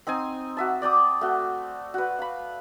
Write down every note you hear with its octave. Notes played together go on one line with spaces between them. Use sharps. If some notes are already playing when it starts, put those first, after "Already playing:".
C4 D#4 C5 G#5
F#4 E5 A5
D5 G5 D6 D#6
A3 F#4
F#4 B4
F5 B5